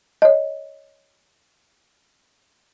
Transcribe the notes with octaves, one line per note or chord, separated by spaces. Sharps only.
C#5 D#5